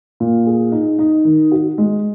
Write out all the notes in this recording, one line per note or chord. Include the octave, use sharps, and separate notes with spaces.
A#2
G#4
D#4
D#4
D#3
F#4
G#3